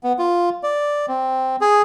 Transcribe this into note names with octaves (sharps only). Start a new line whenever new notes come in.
B3
F4
D5
C4
G#4